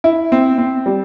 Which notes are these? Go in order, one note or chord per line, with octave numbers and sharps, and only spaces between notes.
E4
C4
C4
G3